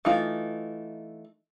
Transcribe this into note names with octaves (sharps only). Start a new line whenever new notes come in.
E3 A3 D#4 F4